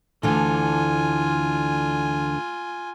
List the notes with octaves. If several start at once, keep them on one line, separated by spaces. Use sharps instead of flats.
D2 D3 E3 F4 G#5